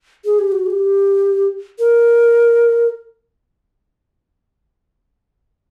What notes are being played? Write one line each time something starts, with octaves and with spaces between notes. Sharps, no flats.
G#4
G4
F#4
G#4
G4
A#4